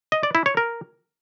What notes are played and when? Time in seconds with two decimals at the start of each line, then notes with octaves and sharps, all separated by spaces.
0.12 D#5
0.23 D5
0.35 E4
0.46 C#5
0.57 A#4